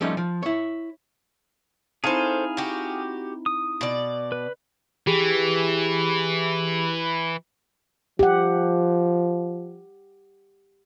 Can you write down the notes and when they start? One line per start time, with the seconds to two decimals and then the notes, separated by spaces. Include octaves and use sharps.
0.01 F3 G3 A3 C#4 D#4
0.17 F3
0.43 E4 C#5
2.04 C4 D#4 E4 G#4 A4 C5 F5 G#5
2.57 F#4 G4
3.46 D#6
3.81 B2 D5
4.32 B4
5.07 E3 G4 G#4
8.19 F3 G4 F#5